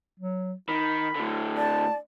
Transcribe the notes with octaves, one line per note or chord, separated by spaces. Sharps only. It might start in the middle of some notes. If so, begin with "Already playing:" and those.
F#3
D#3 B5
A2 D3
D5 A5